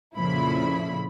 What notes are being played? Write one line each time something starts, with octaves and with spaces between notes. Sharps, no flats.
F2 A#2 C#3 F3 E4 B5